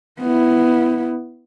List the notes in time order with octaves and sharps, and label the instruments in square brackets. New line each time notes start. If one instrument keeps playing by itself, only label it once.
[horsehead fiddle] B3 E4